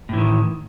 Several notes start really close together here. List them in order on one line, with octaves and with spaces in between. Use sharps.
A2 E3 D#3